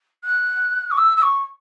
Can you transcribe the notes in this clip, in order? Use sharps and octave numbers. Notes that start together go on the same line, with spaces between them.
F#6
C#6
E6
E6
C#6